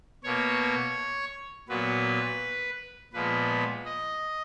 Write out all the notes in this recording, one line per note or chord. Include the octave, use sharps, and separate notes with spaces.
B2 A#3 C#5
A#2 F#3 B3 B4
A#2 F3 G#3 B3 B4
D#5